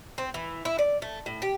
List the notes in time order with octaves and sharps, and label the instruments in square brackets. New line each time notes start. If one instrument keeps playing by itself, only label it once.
[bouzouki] C4
E3
E4
D5
A3
A2
G4